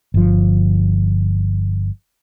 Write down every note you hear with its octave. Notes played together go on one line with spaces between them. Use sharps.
G1 F3